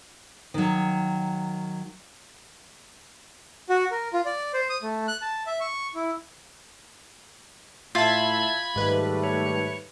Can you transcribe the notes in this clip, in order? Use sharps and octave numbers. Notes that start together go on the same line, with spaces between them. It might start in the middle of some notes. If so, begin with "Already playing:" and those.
D#3 F#3
F#4
A#4
F4
D5
C5
D#6
A3
F#6
A5
E5
C#6
E4
A2 F4 E5 A5 B5 G#6
G#2 D#3 G3 A3 B4
C#5